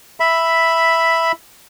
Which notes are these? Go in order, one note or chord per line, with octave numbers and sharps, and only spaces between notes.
E5 B5